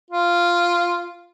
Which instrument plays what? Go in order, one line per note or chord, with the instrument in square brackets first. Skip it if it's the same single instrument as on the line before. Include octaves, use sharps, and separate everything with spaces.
[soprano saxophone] F4